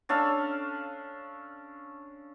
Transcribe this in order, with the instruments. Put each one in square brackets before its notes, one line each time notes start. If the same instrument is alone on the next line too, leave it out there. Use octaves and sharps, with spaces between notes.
[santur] C#4 D4 A4 F5